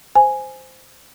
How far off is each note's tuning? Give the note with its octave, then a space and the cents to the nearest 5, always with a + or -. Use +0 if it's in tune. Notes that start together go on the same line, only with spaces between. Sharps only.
C5 -10 G#5 +0